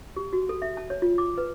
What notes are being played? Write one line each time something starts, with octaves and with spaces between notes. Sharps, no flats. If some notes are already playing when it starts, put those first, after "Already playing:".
G4
F#4
A4
E5
A5
C#5
F4
D6
B4